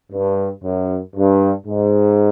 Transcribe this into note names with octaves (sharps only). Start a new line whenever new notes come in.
G2
F#2
G2
G#2